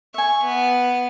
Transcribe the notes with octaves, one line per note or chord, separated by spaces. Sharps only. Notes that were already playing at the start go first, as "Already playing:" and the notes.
E5 G#5 C#6
B3